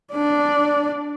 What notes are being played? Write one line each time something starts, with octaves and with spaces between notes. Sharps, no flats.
D4 D5